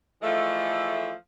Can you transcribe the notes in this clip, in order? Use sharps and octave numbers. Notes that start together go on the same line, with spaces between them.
E3 F3 G#3 A3